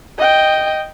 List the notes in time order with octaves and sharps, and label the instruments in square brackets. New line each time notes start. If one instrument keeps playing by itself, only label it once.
[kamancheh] D#5 G5